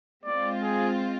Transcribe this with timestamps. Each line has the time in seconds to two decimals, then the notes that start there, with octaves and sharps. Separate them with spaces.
0.25 G#3 C4 F4 D5
0.63 G#4